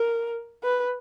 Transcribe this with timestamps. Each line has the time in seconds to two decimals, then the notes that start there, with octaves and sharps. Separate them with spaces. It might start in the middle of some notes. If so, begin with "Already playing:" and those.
Already playing: A#4
0.63 B4